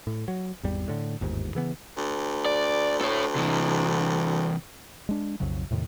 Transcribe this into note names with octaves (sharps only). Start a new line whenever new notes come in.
A2
F#3
G#1 E2 G3
A2 D3
G1 D#2 G#2
C#3 E3 B3
D2
D5
A4 C#5
C3 E3
G#3 D4
B1 F2 C#3 F#3
E2 A2 C3 D#3